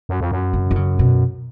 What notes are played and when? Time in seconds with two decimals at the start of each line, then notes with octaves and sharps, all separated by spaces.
0.09 F#2
0.20 F2
0.32 F#2
0.53 C#3
0.71 D#3
0.76 C#3
0.99 B2